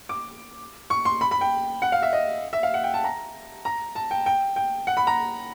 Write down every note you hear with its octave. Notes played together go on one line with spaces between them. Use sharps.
D6
C#6
C6
B5
B5
G5
F#5
F5
E5
D#5
E5
F5
F#5
G5
A5
A#5
A#5
A5
G5
G5
G5
F#5
B5
A#5